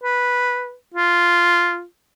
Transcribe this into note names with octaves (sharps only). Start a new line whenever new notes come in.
B4
F4